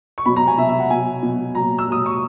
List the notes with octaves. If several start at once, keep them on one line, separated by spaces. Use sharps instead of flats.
C#6
B2 F#3 B5
A#5
G#5
B2 F#3 E5
E5
F#5
B2 F#3 G#5
B2 F#3
A#2 F#3 A#5
E6
A#2 F#3 D#6
C#6